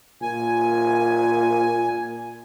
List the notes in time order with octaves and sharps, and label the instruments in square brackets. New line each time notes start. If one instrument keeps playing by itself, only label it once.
[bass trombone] A#2 [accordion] G#5